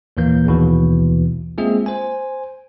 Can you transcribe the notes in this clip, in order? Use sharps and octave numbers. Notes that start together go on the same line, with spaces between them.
D#2 A#2 E3 A#3 G6
A#1 D#2 B2 E3
G#3 A#3 C4 F4 G#4 E5
C5 G#5